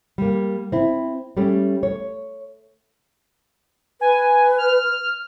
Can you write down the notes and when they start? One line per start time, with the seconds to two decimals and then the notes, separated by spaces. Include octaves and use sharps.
0.18 G3 A#3
0.72 C4 E4
1.37 G3 A3 C#4 G4
1.83 C#5
4.01 B4 G#5
4.58 F6